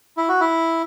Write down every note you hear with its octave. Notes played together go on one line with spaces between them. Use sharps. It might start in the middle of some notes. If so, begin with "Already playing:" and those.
E4
F#4
E4